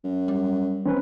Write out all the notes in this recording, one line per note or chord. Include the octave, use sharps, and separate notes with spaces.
F#2
G3
D#3 C4 C#4 B4